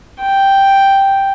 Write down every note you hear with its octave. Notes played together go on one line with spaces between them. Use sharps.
G5